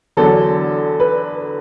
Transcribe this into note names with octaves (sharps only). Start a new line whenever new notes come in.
E2 D3 F#3 A4
B4